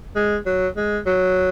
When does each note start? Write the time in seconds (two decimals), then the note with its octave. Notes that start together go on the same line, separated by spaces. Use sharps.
0.15 G#3
0.46 F#3
0.77 G#3
1.06 F#3